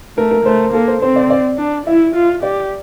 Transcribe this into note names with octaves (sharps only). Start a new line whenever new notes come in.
A3 A#4
A#4
A3 C5
A#3 A4
C5
C4 C5
D5
D5
D4
E4 E5
F4
G4 D5